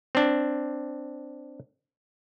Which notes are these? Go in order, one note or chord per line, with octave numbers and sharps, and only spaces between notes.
C4 D4